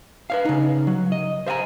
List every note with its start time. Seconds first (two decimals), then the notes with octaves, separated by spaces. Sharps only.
0.30 B4 C#5 F5
0.45 C#3 D#4
0.87 F#3
1.12 D#5
1.47 C5 E5 F5 G#5 A#5